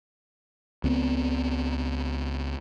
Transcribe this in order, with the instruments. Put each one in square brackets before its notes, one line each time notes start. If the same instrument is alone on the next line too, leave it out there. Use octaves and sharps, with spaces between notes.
[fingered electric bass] C#2 B3 C4